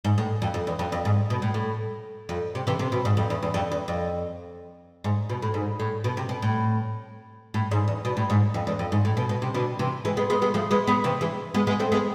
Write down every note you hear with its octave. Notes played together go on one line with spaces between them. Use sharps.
G#2
A2
F2
F2
E2
F2
F2
G#2
B2
A2
A2
F2
C3
C3 E3
C3
B2
G#2
F2
E2
E2
F2
E2
F2
G#2
B2
A2
G#2
A2
B2
C3
B2
A2
A2
G#2
E2
B2
A2
G#2
F2
E2
F2
G#2
A2
B2
B2
C3
B2 D3
C3 E3
E3 G#3
G#3 B3
G#3 B3
G#3 B3
F3 A3
G#3 B3
G#3 B3
C3 E3
E3 G#3
G#3 B3
G#3 B3
A3 C4
G#3 B3